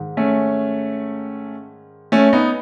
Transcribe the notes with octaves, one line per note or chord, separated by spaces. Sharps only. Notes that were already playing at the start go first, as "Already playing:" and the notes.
Already playing: G#2 D#3
A3 C#4
A3 C#4
B3 D#4